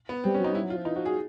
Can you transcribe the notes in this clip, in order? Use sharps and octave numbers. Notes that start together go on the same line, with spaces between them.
B3
G3 C4
C#4
F#3 D#4
G3 E4
F#3
F4
F3
E3 D#4
F3 F#4
F#3 G#4